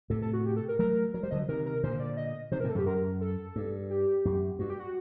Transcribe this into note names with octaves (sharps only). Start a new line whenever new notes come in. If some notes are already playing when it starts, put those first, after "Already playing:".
A2 C3 A4
A4
F#4
G4
A4
A#4
F#3 A3 A#4
F#3 A#4
G3 C5
D3 F#3 D#5
C3 D#3 A#4
A#4
A#2 D3 C5
D5
D#5
C3 D#3 C5
A#4
A2 C3
A4
F#2 A2
G4
F#2 A#4
A4
G2
G4
F#2
G2 F#4
G4
F#4